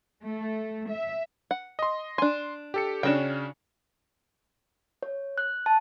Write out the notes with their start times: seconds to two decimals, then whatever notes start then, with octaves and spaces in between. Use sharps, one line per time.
0.23 A3
0.91 E5
1.51 F#5
1.79 D#5 C6
2.18 D4 G#5 C6
2.74 G4 A4 C#7
3.03 C#3 C#4 D4 F#4 G5 E7
5.03 C#5
5.38 F#6
5.66 A5